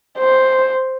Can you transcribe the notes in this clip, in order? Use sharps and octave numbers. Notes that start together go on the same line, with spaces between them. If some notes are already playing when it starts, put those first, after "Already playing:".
C5